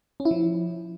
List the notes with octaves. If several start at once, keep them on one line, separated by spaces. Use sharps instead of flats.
C#4
E4
F3